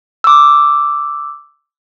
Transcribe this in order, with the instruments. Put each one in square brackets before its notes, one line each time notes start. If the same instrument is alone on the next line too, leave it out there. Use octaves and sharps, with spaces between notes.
[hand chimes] D6 E6